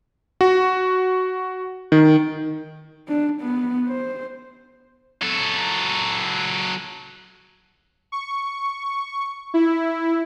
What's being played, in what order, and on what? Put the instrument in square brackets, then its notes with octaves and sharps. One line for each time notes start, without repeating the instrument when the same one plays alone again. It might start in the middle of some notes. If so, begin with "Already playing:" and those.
[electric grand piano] F#4
D#3
[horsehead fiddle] D4
B3
C5
[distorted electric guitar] F#3 A4
[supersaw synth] C#6
E4